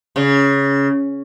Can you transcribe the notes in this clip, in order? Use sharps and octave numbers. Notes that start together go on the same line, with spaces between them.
C#3